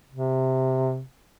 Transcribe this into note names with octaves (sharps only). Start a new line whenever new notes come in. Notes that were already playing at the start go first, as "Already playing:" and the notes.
C3